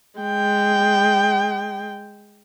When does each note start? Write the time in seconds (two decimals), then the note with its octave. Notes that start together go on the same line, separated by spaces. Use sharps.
0.20 G#3 G5